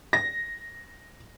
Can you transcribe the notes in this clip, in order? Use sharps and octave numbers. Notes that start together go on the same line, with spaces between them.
A#6